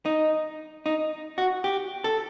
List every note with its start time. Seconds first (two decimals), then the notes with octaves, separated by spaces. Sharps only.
0.06 D#4
0.86 D#4
1.38 F#4
1.64 G4
2.04 A4